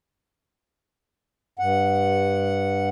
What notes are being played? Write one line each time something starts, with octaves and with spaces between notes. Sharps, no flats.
G2 F#5